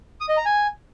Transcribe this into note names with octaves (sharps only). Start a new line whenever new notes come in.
D#6
D#5
A#5
G#5